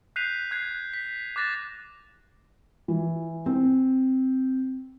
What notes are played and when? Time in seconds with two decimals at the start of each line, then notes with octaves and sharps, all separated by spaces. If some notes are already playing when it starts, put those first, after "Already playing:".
0.16 F#6 G6 B6 C7 D#7 F7
0.51 F#6 G#6 C7
0.93 B6
1.36 D6 F#6 A6 A#6 E7
2.88 E3
3.46 C4